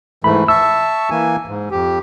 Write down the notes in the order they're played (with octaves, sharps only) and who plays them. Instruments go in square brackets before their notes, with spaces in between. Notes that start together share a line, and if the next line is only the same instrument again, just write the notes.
[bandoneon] G#2 E3 A3 [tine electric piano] B5
[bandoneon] E5 A5 C#6 [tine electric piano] E6
[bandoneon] E3 A#3 G#5
G#2
F2 G4